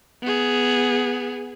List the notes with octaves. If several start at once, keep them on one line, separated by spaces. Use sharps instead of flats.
B3 G#4